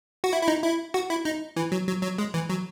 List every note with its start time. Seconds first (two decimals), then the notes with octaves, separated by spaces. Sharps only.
0.24 F#4
0.33 E4
0.43 E4
0.48 D#4
0.63 E4
0.94 F#4
1.10 E4
1.25 D#4
1.56 E3
1.72 F#3
1.87 F#3
2.03 F#3
2.18 G#3
2.34 E3
2.49 F#3